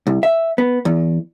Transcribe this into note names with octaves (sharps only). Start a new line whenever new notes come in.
C2
E5
B3
E2